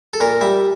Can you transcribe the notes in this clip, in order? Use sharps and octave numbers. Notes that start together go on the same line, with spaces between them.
A4
A#2 A#4
G3 E5